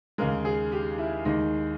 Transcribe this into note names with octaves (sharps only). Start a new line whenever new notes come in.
D#2 C#3 G#3 A#4
G#4
G4
E4
D#2 D#3 G#3 D#4